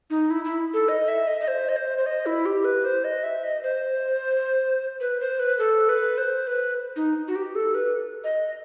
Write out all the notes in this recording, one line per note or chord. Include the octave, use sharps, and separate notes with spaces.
D#4
E4
E4
A4
D#5
E5
D#5
D#5
C5
D#5
C5
C5
D#5
E4
G4
B4
C5
D#5
E5
D#5
C5
B4
C5
B4
A4
B4
C5
B4
D#4
F#4
G4
A4
B4
D#5